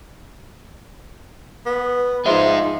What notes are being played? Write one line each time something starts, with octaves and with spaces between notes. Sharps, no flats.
B3
F3 G#3 D#4 C5 E5